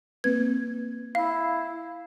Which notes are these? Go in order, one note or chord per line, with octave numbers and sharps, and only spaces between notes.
A#3 C4 B4 G#6
E4 F5